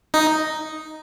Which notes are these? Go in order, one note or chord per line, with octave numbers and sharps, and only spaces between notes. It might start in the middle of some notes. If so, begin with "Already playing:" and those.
D#4